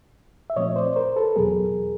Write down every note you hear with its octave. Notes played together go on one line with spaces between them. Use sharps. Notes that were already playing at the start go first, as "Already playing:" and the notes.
E5
A#2 F3 A3 C4 C#5 D#5
C5 D5
A#4 C5
A4 B4
E2 B2 F#3 B3 G#4 A#4